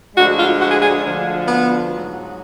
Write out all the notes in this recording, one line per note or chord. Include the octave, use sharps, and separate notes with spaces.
D2 D3 F3 G#3 F#4
F4
F#4
G#4
G#4
D2 D3 F3
B3
G#2 F#3